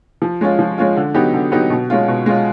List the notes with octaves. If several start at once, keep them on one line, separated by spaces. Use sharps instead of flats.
F3
G#3 C#4 F4
F3
G#3 C#4 F4
D3
F#3 B3 D#4 G4
D3
F#3 B3 D#4 G4
B2
G#3 C#4 F4
B2
G#3 C#4 F4